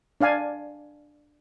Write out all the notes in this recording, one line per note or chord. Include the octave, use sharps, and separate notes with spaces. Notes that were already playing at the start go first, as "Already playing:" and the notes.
D4 D5 F5 G#5